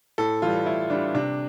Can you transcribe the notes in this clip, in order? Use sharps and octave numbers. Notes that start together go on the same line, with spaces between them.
A2 A4
E3 G3 F4
A2 E4
E3 G3 D4
C3 D4